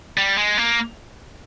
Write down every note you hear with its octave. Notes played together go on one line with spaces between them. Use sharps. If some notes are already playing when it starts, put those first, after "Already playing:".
G3
G#3
A#3